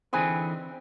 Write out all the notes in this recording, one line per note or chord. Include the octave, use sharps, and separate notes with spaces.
D3 E3 C4 D#4 G#4 B4 G#5